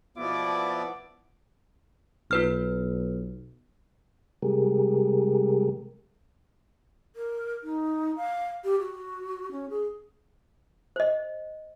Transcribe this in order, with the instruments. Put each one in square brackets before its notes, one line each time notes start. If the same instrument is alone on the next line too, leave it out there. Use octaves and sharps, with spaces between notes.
[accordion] B2 F3 B3 [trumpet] E4 [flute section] D5 [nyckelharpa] D6
[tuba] B1 [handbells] F4 B4 F6
[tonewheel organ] C3 G3 G#3 G4 G#4 A#4
[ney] A#4
D#4
F5
G4
F#4
C#4
G#4
[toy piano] C5 D#5